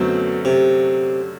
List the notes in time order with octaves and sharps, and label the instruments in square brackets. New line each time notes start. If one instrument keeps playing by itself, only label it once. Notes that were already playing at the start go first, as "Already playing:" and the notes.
Already playing: [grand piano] F#2 D3 F#3 A3 C4 [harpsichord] B2
[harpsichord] C3